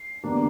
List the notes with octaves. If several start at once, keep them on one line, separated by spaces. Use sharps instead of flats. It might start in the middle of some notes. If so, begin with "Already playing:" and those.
Already playing: C7
E2 D3 G3 A#3 D4